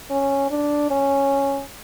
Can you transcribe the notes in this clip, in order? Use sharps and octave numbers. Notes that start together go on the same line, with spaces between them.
C#4
D4
C#4